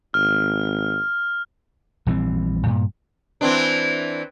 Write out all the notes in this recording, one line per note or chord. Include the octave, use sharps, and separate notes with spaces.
G#1 F6
A#1 E3 G3 C4
G2 A#2
E3 C4 D4